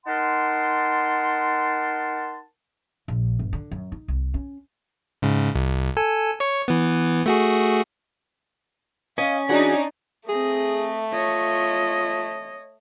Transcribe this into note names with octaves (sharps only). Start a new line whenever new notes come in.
D#4 A#4 F#5 A5 C6
A#1
G1
D3
F#2
D#4
C2
C#4
G#2 C#3
C2
A4 G#5
C#5 C#6
E3 B3
A3 F#4 G#4
C#4 D#5 F5
E3 D4 D#4 F#4 G#4 D5
A3 C4 G#4 D#5
F4 C#5 D#5